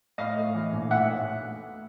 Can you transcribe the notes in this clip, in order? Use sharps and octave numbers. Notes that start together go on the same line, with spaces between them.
A2 D#5 F5
A3
E3
A#1
A2 E5 F#5
A3